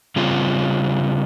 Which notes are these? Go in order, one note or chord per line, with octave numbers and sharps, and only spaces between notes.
C#3 G3 C4 F4